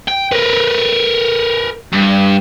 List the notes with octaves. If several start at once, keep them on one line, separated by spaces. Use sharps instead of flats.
G5
A#4 B4
G2